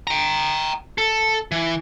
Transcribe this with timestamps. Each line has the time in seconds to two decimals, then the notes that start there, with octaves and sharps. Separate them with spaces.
0.07 G5 A#5
0.98 A4
1.52 E3